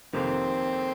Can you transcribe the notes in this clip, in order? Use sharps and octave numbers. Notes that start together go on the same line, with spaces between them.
F1 F2 C3 D#3 A#3 C4